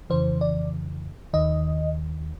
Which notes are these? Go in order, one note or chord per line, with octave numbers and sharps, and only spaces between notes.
F2 C#3 E3 C5
D5
D#2 D#3 D#5